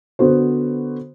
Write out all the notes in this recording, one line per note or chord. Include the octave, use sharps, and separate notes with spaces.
D3 B3 F#4 C5